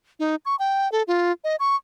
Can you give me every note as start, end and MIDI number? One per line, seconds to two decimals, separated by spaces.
0.19 0.36 63
0.45 0.56 85
0.59 0.90 79
0.92 1.03 69
1.07 1.32 65
1.44 1.56 75
1.60 1.76 85